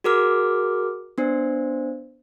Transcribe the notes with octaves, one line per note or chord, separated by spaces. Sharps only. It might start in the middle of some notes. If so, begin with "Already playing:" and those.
F#4 G#4 A#4 D6 F6
B3 D4 C5